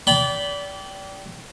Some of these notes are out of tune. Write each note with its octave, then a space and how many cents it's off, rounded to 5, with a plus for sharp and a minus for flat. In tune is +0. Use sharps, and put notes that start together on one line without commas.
D5 -30 G5 -15 B5 +0